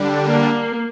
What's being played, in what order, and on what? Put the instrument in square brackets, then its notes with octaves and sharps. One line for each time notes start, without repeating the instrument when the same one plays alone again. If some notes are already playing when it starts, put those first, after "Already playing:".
Already playing: [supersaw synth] D3 G3 D4
[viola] A#3